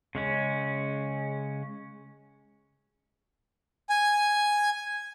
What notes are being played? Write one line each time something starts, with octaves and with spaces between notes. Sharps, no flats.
C#3 G#3 C#4
G#5